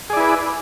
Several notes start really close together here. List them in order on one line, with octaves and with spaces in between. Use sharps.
G#4 D5 E4 B4